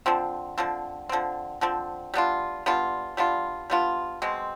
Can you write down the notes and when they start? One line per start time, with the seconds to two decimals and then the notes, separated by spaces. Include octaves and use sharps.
0.06 D3 F3 C4
0.58 D3 F3 C4
1.09 D3 F3 C4
1.61 D3 F3 C4
2.14 G3 B3 D4 F4
2.66 G3 B3 D4 F4
3.17 G3 B3 D4 F4
3.70 G3 B3 D4 F4
4.22 B2 G#3 C4